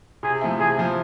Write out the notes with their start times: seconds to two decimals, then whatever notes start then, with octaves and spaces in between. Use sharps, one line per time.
0.23 C3 G#4
0.41 F3 A3 C4 E4
0.59 C3 G#4
0.78 F3 A3 C4 E4